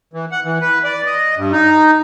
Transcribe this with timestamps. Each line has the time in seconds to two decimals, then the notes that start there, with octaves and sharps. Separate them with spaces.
0.13 E3
0.32 F#5
0.44 E3
0.61 B4
0.84 D5
1.06 D#5
1.37 G2
1.52 D#4